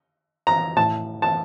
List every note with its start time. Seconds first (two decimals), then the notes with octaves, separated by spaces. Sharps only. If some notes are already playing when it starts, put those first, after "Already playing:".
0.47 A#5
0.76 A2 A5
1.22 A5